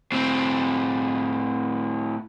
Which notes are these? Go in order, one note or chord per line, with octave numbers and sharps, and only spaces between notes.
A2 C4